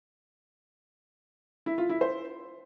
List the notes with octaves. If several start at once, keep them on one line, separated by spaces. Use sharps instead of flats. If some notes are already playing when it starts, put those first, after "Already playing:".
E4
F4
E4
C5